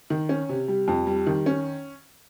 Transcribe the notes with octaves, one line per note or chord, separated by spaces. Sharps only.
D#3
C#4
C3
G3
F2
G3
D#3
C#4